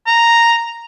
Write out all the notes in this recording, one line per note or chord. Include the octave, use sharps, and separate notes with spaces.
A#5